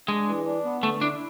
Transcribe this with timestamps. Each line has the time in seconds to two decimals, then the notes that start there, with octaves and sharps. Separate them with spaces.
0.08 G#3 D4
0.27 E3
0.46 D4
0.65 B3
0.83 D3 A3
1.01 D4 E4